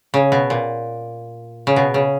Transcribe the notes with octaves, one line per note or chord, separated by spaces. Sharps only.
C#3
B2
A#2
C#3
B2
C#3